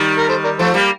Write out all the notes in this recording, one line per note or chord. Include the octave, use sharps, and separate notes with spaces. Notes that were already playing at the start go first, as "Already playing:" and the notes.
Already playing: D#3 G3
A#4
A4 C5
A#4 D5
F3 A3 A4 C5
G3 A#3